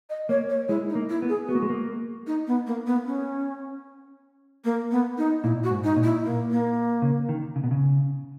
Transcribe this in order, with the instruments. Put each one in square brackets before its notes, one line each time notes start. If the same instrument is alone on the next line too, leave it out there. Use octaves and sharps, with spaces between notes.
[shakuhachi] D#5
[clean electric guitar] A#3 [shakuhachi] C#5
[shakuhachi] C#5
[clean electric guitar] G#3 [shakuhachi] E4
[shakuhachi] D#4
[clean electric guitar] A#3
[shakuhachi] E4
[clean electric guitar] B3
[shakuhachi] G#4
[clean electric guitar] B3 [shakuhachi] F#4
[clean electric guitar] A#3
G#3
A#3
[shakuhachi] D#4
B3
A#3
B3
C#4
A#3
B3
D#4
[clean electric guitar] A#2 [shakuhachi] E4
[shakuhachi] F#4
[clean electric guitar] G#2
[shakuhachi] D#4
[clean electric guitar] A#2
[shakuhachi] E4
A#3
A#3
[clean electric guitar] C#3
D#3
C#3
B2
C#3